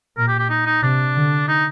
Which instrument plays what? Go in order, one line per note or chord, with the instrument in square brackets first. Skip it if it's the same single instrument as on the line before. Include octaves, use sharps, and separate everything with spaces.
[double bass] A#2 [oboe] A#4
[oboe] G4
G4
D#4
D#4
[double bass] C3 [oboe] D4
[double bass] D3
[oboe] D#4